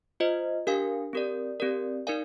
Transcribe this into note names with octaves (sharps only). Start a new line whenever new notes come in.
F4 C5 D#5
D4 G4 A#4 F5 G#5
C4 G4 A#4 D5
C4 G4 A#4 D5
D#4 A#4 D5 F5 G#5